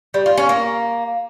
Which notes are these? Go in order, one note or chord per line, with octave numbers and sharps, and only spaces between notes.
G3
F4
C#4
A#3